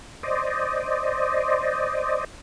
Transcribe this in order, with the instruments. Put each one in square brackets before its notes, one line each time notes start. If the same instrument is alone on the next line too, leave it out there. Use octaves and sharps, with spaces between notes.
[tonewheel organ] C5 D5 D#5